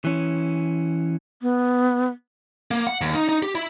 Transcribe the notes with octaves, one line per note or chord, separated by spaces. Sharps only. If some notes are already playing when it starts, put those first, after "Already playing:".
E3 C#4
B3
A#3
F#5
D#2
D#4
D#4
G4
E4